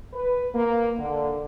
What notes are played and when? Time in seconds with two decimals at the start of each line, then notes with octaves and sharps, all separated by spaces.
0.13 B4
0.54 A#3
0.98 D3